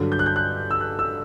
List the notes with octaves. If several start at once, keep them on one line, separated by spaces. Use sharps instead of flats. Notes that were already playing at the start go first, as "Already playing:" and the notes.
Already playing: G2 D3 F#3
G6
F#6
G6
F#6
E6
F#6
E6